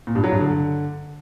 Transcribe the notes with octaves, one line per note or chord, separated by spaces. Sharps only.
A#2
G2
F#3
G2
D3